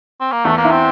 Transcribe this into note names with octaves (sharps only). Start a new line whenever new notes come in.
C4
A#3
E2 A3
A#3
E4
C4